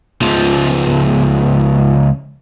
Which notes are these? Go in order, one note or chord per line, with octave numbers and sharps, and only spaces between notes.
C#2 F3